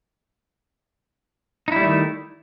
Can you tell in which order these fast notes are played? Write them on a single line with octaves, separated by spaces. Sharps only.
D#4 E4 G3 A3 D#3